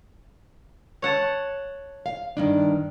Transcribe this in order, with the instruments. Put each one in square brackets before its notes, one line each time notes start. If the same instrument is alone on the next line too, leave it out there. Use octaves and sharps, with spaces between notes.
[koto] C#5 F#5 A5
[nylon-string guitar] F5
G2 D#3 D4